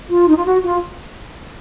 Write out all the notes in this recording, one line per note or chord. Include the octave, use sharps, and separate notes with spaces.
F4
D#4
F4
F#4
F4